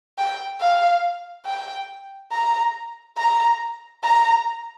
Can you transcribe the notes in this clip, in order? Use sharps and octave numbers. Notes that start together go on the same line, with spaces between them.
G5
F5
G5
A#5
A#5
A#5